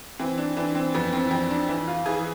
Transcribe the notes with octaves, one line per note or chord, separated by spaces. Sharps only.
E3 C4
D4
E3 D4
C4
F2 B3
C4
F2 C4
D4
E3
F4
E3 G#4